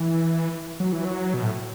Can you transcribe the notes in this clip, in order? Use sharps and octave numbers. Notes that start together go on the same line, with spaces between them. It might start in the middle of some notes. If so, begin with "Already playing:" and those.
Already playing: E3
F#3
E3
F#3
B2
A2